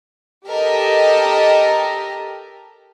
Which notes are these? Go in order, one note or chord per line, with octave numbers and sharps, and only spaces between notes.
G4 A4 A#4 D#5